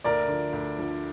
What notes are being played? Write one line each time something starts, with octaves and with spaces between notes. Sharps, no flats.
D2 A#4 D5
D3 F3
D2
D3 F3